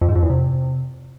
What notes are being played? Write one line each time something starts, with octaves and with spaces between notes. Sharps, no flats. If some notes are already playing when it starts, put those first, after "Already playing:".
F2
G#2
F2
E2
C3